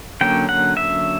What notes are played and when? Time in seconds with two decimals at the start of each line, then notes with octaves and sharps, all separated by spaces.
0.21 D3 F#3 A#3 C#4 G5
0.49 F#5
0.77 E5